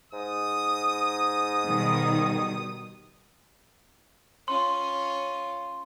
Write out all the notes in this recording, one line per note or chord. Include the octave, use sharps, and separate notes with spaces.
G#2 D#6
B2 D#3 G3
C#4 F4 C6